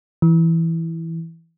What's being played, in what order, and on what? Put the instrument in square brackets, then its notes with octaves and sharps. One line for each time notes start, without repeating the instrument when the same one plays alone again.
[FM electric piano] E3